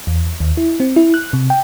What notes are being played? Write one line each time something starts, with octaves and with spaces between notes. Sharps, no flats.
E2
D#2
E4
C4
E4
F#6
C3
G5